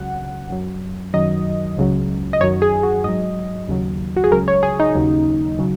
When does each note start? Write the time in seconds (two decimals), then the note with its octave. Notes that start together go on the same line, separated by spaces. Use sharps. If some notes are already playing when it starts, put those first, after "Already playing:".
Already playing: C#2 C#3 F#3 F#5
0.50 F#2 F#3
1.13 F#2 D#3 F#3 D#5
1.77 C#2 C#3 F#3
2.33 D#5
2.41 F#2 D#3 F#3 C#5
2.62 G#4
2.83 F#4
3.04 G#2 F#3 D#5
3.68 D#2 C#3 F#3
4.16 F#4
4.24 G#4
4.32 C#2 C#3 F#3 A#4
4.48 C#5
4.63 G#4
4.79 D#4
4.95 D#2 C#3 F#3
5.59 C#3 F#3